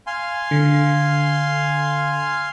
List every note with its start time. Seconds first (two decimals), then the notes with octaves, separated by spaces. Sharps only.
0.07 F5 G#5 C6
0.51 D3